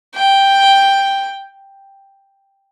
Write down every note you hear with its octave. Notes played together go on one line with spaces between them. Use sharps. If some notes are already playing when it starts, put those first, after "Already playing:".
G5